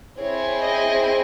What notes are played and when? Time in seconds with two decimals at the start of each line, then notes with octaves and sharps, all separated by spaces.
0.19 C4 E4 G#4 C#5
0.62 D#5